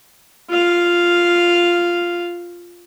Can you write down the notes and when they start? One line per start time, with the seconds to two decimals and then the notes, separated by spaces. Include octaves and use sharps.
0.50 F4 F5